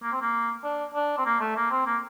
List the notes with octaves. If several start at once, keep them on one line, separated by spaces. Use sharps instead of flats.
A#3
C4
A#3
D4
D4
C4
A#3
A3
A#3
C4
A#3